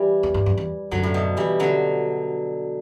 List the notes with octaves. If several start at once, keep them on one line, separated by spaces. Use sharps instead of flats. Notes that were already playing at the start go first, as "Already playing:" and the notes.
Already playing: E3 G3
E2
G2
F#2
E2
F#2 D3 F#3
A2
B2
E3 G3
D3 F#3